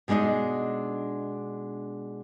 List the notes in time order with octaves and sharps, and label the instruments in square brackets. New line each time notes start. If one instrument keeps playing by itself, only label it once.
[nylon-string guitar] B2 G#3 D4 D#4 D#5